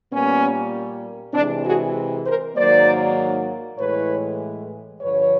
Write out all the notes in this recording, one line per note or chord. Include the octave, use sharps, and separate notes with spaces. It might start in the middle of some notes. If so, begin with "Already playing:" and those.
A#2 G3 A#3 B3 C#4
C3 E3 G#3 C4 D4
F#4 G#4
A#4 C5
G#2 D#3 F#3 A#3 C5 D5
A2 E3 G#3 B4 C#5
G2 D3 F3 B4 C#5